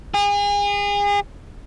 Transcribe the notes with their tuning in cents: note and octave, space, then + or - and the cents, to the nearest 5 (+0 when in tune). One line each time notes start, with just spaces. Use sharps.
G#4 -35